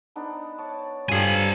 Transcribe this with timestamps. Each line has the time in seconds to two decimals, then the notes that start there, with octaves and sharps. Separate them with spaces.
0.16 B3 D4 D#4
0.58 C#5 D5 A5
1.09 G2 C4 F4 A4 G#5 A5